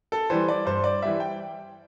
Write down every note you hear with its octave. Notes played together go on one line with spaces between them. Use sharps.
A4
E3 G3 C5
D5
G2 C5
D5
E3 G3 E5
G5